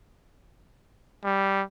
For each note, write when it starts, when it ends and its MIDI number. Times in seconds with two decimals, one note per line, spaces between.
1.24 1.63 55